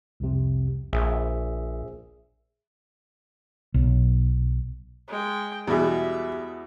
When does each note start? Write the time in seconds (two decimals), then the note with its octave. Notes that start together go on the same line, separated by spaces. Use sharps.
0.20 C2 F2 C3
0.93 A#1 G#4 E5
3.74 B1
5.08 G#3 G5
5.67 E2 B2 G3 G#4 E5